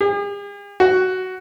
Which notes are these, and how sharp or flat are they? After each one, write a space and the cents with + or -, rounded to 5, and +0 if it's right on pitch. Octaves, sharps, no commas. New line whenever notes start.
G#4 -45
F#4 +10